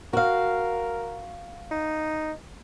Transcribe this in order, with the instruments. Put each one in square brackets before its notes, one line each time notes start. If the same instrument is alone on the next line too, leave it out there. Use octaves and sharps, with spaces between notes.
[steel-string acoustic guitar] F#4 F5 [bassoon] A#4
[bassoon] D#4